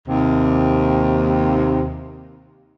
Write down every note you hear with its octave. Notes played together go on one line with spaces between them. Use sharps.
D#2 C3